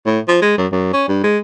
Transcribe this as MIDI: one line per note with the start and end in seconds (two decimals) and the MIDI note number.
0.06 0.19 45
0.28 0.41 53
0.42 0.53 56
0.58 0.67 42
0.72 0.88 42
0.93 1.05 61
1.09 1.21 43
1.24 1.38 56